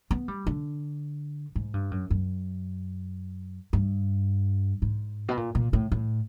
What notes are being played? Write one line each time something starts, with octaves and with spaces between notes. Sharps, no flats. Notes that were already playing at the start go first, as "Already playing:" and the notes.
B3
G3
D3
G#2
G2
F#2
F#2
G2
G#2
B2
A#2
A#2
A2
A2